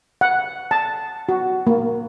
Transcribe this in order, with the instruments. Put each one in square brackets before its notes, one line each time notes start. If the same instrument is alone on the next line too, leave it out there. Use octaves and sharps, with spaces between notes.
[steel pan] F#5
A5
F#4
A#3